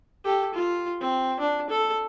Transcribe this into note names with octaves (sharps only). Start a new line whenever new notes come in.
G4 A4
F4
C4
D4
A4